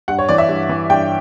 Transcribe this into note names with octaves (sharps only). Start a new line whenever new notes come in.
G2 F#5
C#5
E3 D5
E5
G2
E3
G2 G5